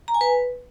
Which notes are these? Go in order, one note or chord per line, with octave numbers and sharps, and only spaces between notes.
A#5
G#5
B4